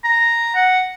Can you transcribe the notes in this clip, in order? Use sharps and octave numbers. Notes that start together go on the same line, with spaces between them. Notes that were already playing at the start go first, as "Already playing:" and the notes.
A#5
F#5